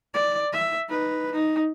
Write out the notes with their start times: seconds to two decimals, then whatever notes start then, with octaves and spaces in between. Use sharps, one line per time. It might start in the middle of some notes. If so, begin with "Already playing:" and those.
0.14 D5
0.53 E5
0.89 D#4 B4
1.31 D#4